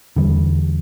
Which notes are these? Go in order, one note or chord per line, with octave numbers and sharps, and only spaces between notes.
E2 D3 G3